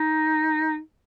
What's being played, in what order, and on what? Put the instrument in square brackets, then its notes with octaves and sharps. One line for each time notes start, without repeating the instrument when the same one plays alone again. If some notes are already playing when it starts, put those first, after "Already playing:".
Already playing: [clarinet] D#4